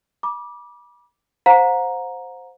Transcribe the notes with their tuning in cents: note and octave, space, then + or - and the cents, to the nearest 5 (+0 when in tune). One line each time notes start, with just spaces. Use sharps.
B5 -35 D6 +0
C5 +0 F#5 -45 A#5 +5